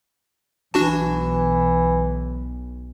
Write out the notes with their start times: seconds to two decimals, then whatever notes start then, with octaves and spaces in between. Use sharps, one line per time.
0.74 B1 E3 D4 F#4 A5